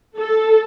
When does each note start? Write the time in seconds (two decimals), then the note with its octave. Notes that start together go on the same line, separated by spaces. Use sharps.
0.18 A4